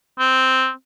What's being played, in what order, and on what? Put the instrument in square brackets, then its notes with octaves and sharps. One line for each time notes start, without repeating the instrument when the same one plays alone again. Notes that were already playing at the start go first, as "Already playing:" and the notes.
[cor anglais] C4